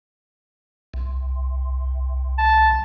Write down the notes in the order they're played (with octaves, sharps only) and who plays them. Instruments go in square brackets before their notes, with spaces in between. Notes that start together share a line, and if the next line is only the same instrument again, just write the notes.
[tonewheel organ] C2
[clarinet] A5